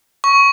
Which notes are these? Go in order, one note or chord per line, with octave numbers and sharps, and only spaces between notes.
C#6